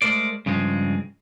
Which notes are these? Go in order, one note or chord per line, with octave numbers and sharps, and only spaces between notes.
G#3 A3 A#4 C5 D5
G2 C#3 F3 G#3 C4